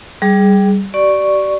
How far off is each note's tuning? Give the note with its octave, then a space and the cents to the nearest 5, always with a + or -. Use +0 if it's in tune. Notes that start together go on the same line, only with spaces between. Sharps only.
G3 -5 G#4 +5
G4 -45 D5 +0 C#6 +0